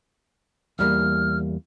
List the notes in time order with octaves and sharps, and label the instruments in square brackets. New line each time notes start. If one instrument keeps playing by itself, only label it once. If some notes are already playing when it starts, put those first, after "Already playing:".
[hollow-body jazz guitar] E2 G3 A#3 [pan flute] F6